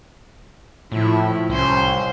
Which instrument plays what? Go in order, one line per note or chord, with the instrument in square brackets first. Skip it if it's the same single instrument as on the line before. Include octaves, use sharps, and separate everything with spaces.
[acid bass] A2 [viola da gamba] F3 E4
[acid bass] C2 [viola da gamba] C#4 C5